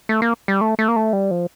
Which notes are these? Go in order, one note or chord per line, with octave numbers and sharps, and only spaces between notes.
A3
A#3
G3
A3
A3
A#3
A3
G3
F3